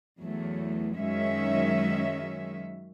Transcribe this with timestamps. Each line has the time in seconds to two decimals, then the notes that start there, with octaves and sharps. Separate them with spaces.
0.19 E2 F#3 A3
0.96 F#2 D#3 F#3 G#3 C#4 E5